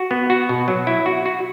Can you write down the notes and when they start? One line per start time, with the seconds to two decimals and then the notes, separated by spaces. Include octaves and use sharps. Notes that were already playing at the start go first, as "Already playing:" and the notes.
Already playing: F#4
0.11 B3
0.30 F#4
0.49 B2
0.68 F#3
0.87 E4
1.06 F#4
1.26 F#4